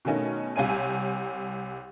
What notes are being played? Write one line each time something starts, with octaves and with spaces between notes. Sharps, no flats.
B2 D#3 A3 C#4 D#4
C2 C3 C#5 G#5 D#7